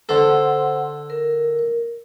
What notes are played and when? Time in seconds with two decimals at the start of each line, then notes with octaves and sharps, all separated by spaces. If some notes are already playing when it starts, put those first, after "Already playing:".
0.09 D3 A4 C5 F#5 C6
1.10 A#4